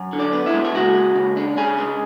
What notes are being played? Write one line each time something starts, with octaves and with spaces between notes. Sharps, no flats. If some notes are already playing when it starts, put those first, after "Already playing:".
Already playing: F#2
D3
D4 D5
B3
E4 E5
G#3
E5
C#3 F#4 F#5
G#3
C#3
D4
C#3 G#4 G#5
G#3